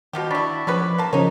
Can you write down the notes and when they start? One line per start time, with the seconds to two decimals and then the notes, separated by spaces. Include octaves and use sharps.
0.13 B2 D#3 F3 F#4 G4
0.31 D4 E4 B5 C#6 A6 B6
0.67 F3 C#4 G#4 B4 D6
0.98 A#3 A5
1.13 C#3 F3 C#4 D#4 A#4 C#5